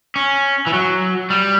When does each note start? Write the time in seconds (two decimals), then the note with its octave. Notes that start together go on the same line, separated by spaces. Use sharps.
0.16 C#4
0.67 E3
0.73 F#3
1.30 G3